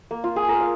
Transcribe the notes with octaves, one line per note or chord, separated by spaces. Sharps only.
A#3
F4
G#4
A#4
F5